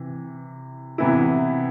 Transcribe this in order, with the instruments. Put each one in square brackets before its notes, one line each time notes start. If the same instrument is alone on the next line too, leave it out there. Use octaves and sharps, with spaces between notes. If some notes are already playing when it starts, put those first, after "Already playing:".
Already playing: [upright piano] C3 E3
C3 E3 B3 E4